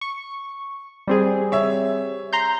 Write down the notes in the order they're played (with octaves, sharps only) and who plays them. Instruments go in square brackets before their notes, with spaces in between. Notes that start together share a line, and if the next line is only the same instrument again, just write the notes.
[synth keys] C#6
G3 C4 G#4
[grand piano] C#5 E5
[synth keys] A#5 C6 G6